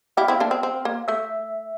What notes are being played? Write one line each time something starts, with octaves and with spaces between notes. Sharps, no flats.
E4 G4 F5
C4 E4
A#3 D4
C4
C4
A#3
A3 E5